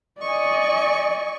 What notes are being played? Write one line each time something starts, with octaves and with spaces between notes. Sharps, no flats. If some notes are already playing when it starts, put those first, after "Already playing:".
D5 D#5 G#5 C#6